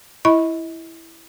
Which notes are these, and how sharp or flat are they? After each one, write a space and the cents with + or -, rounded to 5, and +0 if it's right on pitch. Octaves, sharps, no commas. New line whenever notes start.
E4 +0 D#5 +40 B5 +0